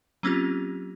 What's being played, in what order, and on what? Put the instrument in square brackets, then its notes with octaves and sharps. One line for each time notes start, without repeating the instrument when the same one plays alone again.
[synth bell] F#3 A#3 C4 C#4 F4 G4